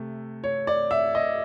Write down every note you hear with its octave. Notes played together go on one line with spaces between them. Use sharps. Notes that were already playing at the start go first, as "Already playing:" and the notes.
Already playing: C3 A3
C#5
D5
E5
D#5